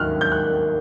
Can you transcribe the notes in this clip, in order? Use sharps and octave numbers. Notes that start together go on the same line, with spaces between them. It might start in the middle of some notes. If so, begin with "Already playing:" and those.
Already playing: D#2 D#3 F#3 F6 F#6
G6
F#6